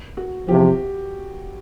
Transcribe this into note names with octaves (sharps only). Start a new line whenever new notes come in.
F#4
E2 C3 F3 G4